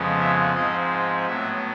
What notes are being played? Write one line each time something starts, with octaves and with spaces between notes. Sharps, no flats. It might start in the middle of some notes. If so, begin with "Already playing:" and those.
Already playing: F2 C#3 F3 G#3 B3
E5
G#2 F3 G#3 C4 D#5
A2 F#3 B3 E5